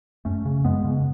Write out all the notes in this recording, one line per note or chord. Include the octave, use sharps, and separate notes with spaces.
F#2 A3 C#4
C#3
F#2 G#3 B3
C#3